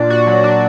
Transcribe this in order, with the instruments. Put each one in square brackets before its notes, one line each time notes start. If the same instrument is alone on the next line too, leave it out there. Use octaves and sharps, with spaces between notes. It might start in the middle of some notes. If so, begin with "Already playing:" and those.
Already playing: [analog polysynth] A#2 D4 [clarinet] D5
[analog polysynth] F#4
F#3
D4